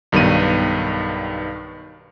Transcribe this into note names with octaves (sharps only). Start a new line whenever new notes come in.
B1 G2 D#3 B3 D#7